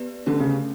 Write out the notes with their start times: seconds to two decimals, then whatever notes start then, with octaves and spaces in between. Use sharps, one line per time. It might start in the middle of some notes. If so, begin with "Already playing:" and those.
Already playing: B3 G4 B4 D5
0.26 D3 A3 C#4 G4 B4
0.40 C#3